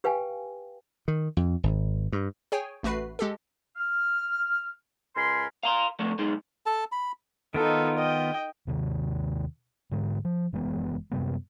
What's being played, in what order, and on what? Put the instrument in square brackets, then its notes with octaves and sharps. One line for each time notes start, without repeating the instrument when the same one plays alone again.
[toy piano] G4 B4 F5 G5 G#5
[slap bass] D#3
F2
G#1
G2
[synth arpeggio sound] G#4 C#5 G5 G#5
A1 A3 F#4 B4 B5 C7
G#3 G4 A4
[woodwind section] F6
C#2 A#4 G#5 B5 C6
[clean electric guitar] F5 A#5 C6
D3 F3 A3
B1 G#3 D#4 G#4
[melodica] A4 A5
B5
[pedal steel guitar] D#3 B3 F4 [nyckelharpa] D#4 A4
[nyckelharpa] D#5 G5
[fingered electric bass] D#2 C3 D#3
G#2 D3 G#3
F3
F#1 E3 G#3 B3
F#2 C3 G3 B3